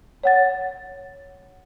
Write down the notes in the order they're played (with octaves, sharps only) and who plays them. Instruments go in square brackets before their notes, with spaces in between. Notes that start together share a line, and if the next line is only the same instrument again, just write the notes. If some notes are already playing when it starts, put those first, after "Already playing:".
[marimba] C#5 F#5 A6